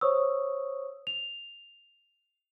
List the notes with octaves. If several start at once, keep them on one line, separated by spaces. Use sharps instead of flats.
C5 C#5 C#6 D#6 E6
F7